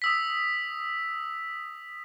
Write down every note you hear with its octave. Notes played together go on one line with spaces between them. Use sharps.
D#6 E6 B6